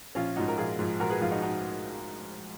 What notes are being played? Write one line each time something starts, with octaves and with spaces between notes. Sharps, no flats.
A#1 C#4 F4
G#2 F3 D#4 F#4
A#4
A#1 F4 G#4
G#2 F3
A#1 F#4 A#4
G#4 B4
G#2 F3 F4 G#4
D#4 F#4
D#4 F#4